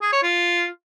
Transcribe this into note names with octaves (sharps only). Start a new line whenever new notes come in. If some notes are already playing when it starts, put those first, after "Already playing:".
G#4
C#5
F4